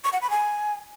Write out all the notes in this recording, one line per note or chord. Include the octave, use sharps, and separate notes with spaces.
C#6
F#5
B5
G#5